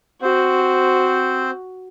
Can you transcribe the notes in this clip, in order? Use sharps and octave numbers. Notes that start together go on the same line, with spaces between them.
C4 F#4 C5